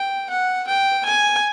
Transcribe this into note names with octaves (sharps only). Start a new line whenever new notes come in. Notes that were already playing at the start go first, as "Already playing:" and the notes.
Already playing: G5
F#5
G5
G#5